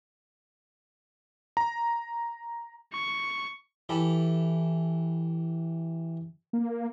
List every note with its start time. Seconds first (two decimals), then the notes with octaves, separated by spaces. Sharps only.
1.57 A#5
2.93 C#6
3.89 E3 G4 A4 B5
6.53 A#3